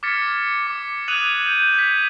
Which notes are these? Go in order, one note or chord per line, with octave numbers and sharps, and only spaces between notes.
D6 F6 G#6 A6 B6 C#7
D6
D#6 F#6 G#6 D#7 F7 F#7
G6
G#6 B6